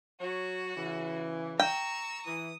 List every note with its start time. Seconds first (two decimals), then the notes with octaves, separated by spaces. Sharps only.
0.20 F#3 F#4 C#5
0.76 C#3 E3
1.59 G5 A#5 C#6 E6
2.26 E3 D#6